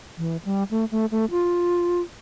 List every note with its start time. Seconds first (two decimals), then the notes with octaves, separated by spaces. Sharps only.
0.18 E3
0.45 G3
0.71 A3
0.92 A3
1.11 A3
1.31 F4